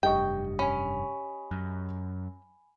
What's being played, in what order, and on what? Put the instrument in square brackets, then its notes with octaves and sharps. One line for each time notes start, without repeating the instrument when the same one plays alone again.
[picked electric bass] F1 G2 [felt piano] G4 D#5 C#6 [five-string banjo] G5
[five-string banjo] C#4 [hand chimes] G#5 B5
[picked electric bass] F#2